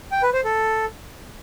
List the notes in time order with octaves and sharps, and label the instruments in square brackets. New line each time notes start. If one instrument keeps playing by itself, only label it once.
[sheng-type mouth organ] G5
B4
C5
A4